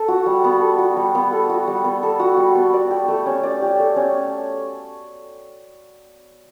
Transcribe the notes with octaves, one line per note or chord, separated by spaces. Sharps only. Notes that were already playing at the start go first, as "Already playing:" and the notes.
Already playing: A4
F#4
G3
B3
A4
F#4
G3
B3
A4
F#4
G3
B3
A4
F#4
G3
B3
D5
G4
A3
C#4
D5
G4
A3
C#4